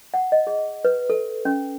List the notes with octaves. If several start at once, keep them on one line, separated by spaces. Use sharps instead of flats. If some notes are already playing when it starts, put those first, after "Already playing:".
F#5
D#5
G#4
B4
A4
C#4